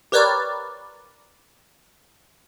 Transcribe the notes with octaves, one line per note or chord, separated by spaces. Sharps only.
G4 A#4 B4 C#5 D5